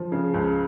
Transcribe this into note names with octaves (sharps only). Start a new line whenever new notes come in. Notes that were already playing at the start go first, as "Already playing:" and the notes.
Already playing: F3
C#3
C#2